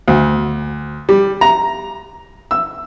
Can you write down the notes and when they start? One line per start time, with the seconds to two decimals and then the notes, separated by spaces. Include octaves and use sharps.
0.08 D2
1.09 G3
1.41 A#5
2.51 E6